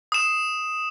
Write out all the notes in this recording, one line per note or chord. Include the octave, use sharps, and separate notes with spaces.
D#6 E7